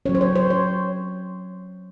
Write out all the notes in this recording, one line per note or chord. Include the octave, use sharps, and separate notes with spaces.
F#3 C#4 C#5
C5
C#5
C5
C#5